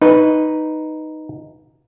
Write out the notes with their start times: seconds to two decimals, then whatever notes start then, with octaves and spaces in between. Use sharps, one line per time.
0.02 D#4 B4